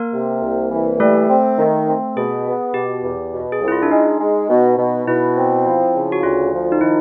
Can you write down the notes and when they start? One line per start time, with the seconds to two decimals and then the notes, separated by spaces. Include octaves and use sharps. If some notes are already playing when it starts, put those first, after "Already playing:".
Already playing: A#3 A#4
0.13 C3
0.43 C2
0.71 E3
1.00 G3 A3 A4
1.29 C4
1.59 D#3
1.88 C4
2.17 B2 G#4
2.46 B3
2.74 B2 G4
3.04 E2
3.33 B2
3.52 G#4
3.61 C2
3.68 E4
3.72 F4
3.83 D4
3.91 G#3 D#4
4.19 G#3
4.49 B2
4.78 B2
5.07 B2 E4
5.36 C4
5.66 F3
5.95 C#3
6.12 F#4
6.23 D2 F4
6.53 F3
6.72 D#4
6.81 D#3 E4